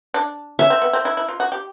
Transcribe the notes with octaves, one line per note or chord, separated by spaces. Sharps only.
D4
C#4 E5
C4
B3
C4
E4
E4
F4
F#4
G4